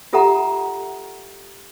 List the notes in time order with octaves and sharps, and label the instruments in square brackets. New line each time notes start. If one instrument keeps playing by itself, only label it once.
[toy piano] F4 G4 A4 E5 F#5 A#5